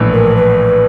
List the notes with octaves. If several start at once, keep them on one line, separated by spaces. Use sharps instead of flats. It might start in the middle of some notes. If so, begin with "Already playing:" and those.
Already playing: A#1 A2 E3
A#4
B4